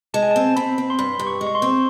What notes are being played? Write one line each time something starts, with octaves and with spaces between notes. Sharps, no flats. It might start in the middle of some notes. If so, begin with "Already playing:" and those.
G#3 A5
G#5
A5
C4
C4 B5
C4
C6
G2 B5
G2
C#6
G#3
C#6
C6
C4